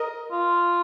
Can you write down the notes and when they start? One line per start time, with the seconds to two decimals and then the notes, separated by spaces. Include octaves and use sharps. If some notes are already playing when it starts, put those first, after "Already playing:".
Already playing: A#4 D#5
0.32 F4